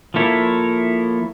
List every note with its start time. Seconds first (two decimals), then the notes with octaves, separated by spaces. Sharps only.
0.14 F3 A#3 E4 A4 C#5